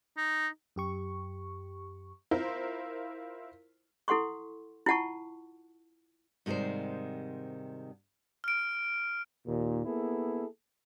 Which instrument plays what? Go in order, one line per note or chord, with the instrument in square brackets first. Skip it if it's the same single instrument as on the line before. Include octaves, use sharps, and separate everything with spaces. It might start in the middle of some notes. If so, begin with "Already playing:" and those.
[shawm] D#4
[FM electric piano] F#2 G4 C#6
[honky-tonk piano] E4 F4 A#4 C5
[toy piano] E4 A4 F#5 C6 C#6
E4 F4 F#5 A5 C#6
[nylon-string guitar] G#2 C3 D#3 G3 C5
[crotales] F6 D7
[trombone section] D#2 A#2
A#3 B3 E4 G#4 A4